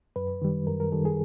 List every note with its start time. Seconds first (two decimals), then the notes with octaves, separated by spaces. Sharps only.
0.16 F#2 B4
0.42 D#3 G3
0.67 F#2 A#4
0.80 A#4
0.92 D#3 G3 A4
1.05 G#4